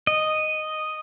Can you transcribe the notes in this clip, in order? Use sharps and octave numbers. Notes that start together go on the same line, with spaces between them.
D#5